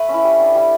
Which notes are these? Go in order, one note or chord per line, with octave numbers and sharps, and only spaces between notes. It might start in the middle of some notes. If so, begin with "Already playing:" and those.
Already playing: A3 B4 E5
C#4
E4
G3
D4
G3